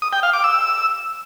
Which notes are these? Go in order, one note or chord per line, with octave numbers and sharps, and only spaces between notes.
D#6
G5
F5
D6
E6